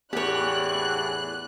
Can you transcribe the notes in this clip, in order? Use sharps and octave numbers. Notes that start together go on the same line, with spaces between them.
E2 A2 G4 C#5 F#6